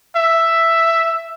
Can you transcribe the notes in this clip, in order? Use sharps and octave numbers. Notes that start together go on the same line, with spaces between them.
E5